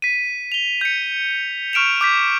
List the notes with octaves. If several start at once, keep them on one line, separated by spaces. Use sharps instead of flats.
B6 D#7
F7 G7
G6 C#7
C#6 F6 D7 E7 F7
D6 G6 B6